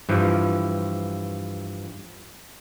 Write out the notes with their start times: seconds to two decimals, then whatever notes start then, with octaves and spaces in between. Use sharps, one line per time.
0.09 G2 E3 F3